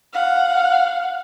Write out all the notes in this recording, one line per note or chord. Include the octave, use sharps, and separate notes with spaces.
F5 F#5